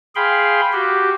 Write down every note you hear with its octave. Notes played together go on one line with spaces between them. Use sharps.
G#4 F5 G5 B5 C6
F#4 G4